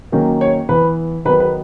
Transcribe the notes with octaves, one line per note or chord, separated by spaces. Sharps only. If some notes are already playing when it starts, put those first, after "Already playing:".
D#3 F#3 A#3 C#4
C#5
E3 B3 B4
D#3 F#3 B3 B4
B4